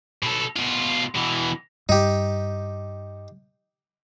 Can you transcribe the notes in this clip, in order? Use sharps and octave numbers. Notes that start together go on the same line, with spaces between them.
B2 A4
B2 F4
B2 E3
G2 D#4 G4